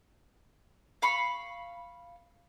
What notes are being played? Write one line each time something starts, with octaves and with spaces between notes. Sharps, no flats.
F5 B5 C#6